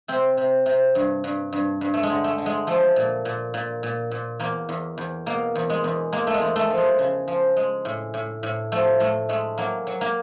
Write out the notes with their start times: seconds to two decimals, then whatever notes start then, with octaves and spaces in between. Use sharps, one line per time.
0.08 C3 C4
0.37 C3
0.66 C3
0.95 G2
1.24 G2
1.53 G2
1.81 G2
1.94 A3
2.03 G#3
2.10 D3
2.24 A3
2.38 D3
2.46 G#3
2.67 F3 A3
2.96 A#2
3.25 A#2
3.54 A#2
3.83 A#2
4.11 A#2
4.40 E2 A#3
4.69 E2
4.98 E2
5.26 B2 A#3
5.55 E2
5.70 G#3
5.84 E2
6.12 G#3 A#3
6.27 A3
6.34 G#3
6.42 E2
6.56 A3
6.70 F3
6.77 G#3
6.99 C#3
7.28 F3
7.57 G#3
7.85 A2
8.14 A2
8.43 A2
8.72 F3 A3
9.00 A2 A3
9.29 G#3 A3
9.58 F#3 A#3
9.87 F#3
10.01 A#3